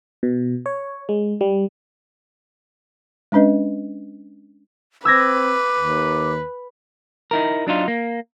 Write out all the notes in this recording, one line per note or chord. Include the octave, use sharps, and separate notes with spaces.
B2
C#5
G#3
G3
G#3 C#4 D4 B4 D#5
C4 B4 D6 E6 G#6 A#6
D#2
D#4 E4 A#4
F#3 D4 D#4 F4
A#3